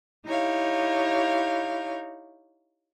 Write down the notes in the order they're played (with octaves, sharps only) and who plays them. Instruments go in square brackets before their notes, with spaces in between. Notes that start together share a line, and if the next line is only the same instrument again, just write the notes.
[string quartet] D#4 E4 G4 C#5 F5